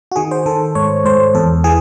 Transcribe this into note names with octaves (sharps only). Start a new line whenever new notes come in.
F#4
D#3 G#4
C5
D#3 A4
G#2 C#5
G#2 C5
E2 A4
E3 G#4